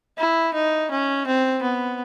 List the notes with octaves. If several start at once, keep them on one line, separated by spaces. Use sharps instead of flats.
E4
D#4
C#4
C4
B3